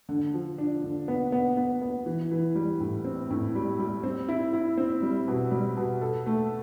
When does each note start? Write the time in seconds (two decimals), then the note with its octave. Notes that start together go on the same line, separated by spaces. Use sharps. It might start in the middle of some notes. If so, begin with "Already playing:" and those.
0.09 D3
0.34 F3
0.58 D4
0.84 D3
1.08 B3
1.32 B3
1.57 B3
1.81 B3
2.06 E3
2.31 E3
2.55 G3
2.80 A2
3.05 C4
3.30 A2
3.55 G3
3.79 G3
4.03 C4
4.28 E4
4.53 E4
4.78 C4
5.02 G3
5.28 B2
5.51 G3
5.77 B2
6.01 A4
6.26 A3